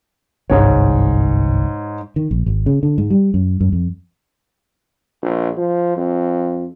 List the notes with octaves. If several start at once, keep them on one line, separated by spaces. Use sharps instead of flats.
G1 C2 G#2 C#5
D#3
A#1
G#1
C#3
D3
G#2
G3
F#2
F#2
F2
A#1
F3
F2